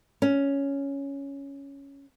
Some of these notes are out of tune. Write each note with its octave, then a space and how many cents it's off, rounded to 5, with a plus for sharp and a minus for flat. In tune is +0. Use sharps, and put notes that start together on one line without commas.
C#4 +5